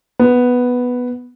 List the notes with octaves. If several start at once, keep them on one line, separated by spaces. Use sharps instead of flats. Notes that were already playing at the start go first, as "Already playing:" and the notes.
B3